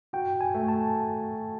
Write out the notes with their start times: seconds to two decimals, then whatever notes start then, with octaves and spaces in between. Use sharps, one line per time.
0.13 F#4 G5
0.41 G#5
0.54 A3
0.68 A5